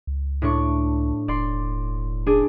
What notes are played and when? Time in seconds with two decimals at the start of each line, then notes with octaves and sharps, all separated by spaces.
0.07 C#2
0.42 A2 D4 C#6
1.28 E1 D5 C6
2.26 D4 G#4